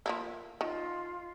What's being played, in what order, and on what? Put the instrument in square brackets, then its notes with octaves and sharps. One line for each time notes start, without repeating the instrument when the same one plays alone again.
[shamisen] F3 A#3 E4
[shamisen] D#3 [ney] F4